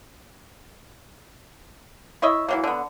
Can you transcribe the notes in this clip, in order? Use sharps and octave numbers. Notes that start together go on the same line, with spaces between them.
E4 C#5 D#5 E5
E3 F#3 A#3
D3 B3